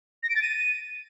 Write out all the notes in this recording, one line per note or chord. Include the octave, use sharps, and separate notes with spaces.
A#6
D7
A6
D#7